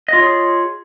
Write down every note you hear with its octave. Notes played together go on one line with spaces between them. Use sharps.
F4 G#4 C#5 D#5